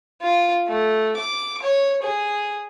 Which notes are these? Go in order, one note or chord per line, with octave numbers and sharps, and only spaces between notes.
F4
A3
D6
C#5
G#4